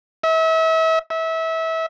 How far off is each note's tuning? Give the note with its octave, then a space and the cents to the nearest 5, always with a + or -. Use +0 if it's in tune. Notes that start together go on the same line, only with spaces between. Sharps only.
E5 -35
E5 -25